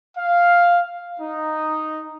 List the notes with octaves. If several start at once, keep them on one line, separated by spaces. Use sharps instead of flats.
F5
D#4